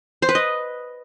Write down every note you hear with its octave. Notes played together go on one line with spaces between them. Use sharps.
C5
B4
D#5